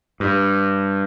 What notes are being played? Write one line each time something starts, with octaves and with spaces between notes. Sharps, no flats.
G2